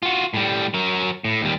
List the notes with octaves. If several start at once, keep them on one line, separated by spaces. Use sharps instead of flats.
F4 F#4
A2 G3
F#3 A#4
A2
D#2 G3